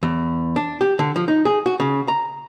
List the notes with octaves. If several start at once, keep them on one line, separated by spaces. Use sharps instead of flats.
E2
D4
G4
D3
F3
D#4
G#4
F#4
C#3
A#5